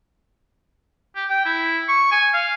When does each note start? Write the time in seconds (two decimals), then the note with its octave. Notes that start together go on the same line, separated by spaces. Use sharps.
1.16 G4
1.29 G5
1.46 E4
1.89 C#6
2.11 G#5
2.34 F5